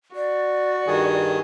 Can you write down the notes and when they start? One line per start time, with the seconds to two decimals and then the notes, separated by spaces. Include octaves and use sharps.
0.15 F#4 D5
0.87 G2 D#3 G#4